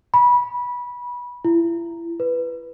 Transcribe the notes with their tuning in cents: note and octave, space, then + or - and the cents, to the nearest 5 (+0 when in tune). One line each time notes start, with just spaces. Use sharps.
B5 -20
E4 +35
B4 +0